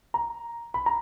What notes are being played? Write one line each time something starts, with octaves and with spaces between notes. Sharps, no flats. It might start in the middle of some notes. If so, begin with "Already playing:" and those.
A#5
B5
A#5